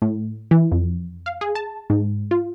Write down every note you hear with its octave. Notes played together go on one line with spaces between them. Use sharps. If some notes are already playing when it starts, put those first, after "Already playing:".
A2
E3
F2
F5
G#4
A5
G#2
F4